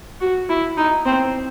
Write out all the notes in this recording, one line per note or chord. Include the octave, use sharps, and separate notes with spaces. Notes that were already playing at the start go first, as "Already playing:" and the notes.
F#4
E4
D#4
C4